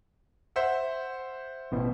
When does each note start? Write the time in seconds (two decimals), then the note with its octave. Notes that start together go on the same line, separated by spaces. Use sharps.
0.56 C5 E5 F#5
1.72 A1 B2